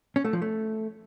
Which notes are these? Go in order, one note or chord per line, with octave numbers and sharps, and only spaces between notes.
C#4
A3
F3
A3